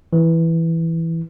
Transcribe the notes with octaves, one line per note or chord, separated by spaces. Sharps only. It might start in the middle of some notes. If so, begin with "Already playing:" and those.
E3